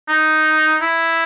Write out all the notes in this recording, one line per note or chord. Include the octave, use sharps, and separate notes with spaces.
D#4
E4